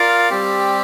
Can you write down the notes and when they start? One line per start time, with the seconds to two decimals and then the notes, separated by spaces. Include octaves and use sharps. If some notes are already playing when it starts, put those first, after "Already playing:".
Already playing: F4 A#4 D5 F5
0.30 G3 C4 G4